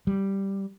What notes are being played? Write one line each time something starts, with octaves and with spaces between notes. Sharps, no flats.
G3